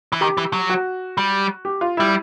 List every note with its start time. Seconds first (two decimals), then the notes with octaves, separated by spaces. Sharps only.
0.12 E3
0.21 D#3 G4
0.37 E3
0.53 F#3
0.70 F#4
1.18 G3
1.65 G4
1.81 F4
1.97 G3 E4